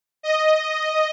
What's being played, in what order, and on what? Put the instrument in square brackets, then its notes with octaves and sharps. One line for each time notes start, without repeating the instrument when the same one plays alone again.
[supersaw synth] D#5